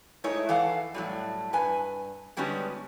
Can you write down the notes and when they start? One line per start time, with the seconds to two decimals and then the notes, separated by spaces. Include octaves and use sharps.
0.24 G#3 A3 D#4 E4 C#5
0.49 E3 A4 F5 F#5
0.94 A2 F#3 G3
1.53 G2 B4 G#5
2.37 D3 G3 G#3 B3 C#4 F#4